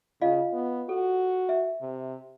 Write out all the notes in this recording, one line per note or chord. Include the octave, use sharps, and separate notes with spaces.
C#3 F4 D#5 F5
B3
F#4 A4
E5
C3